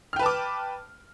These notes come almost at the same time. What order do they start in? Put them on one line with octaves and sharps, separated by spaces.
F6 G5 B4 A5 D6